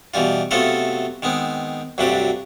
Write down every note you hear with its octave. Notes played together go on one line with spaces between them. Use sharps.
B2 E3 G3 F4
C3 F#3 A3 B3 F4 A4
D#3 G#3 B3 C4
D2 G2 C3 F#3 D4 B5